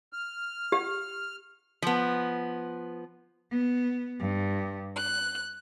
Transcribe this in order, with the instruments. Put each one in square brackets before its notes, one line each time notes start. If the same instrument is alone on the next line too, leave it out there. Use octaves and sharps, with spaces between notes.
[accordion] F6
[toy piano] G4
[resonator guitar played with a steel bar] F3 B3
[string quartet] B3
G2
F#6